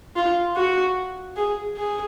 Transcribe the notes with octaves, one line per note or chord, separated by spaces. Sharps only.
F4
F#4
G#4
G#4